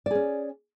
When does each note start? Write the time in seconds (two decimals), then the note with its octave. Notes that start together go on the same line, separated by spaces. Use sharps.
0.06 D5
0.11 G#4
0.15 C#4